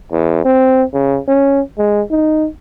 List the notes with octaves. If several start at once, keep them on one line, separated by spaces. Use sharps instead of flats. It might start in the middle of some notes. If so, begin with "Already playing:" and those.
E2
C4
C#3
C#4
G#3
D#4